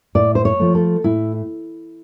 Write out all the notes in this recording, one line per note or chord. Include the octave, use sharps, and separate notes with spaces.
A2 D5
C5
C#5
F3 A3
A4
A2 E4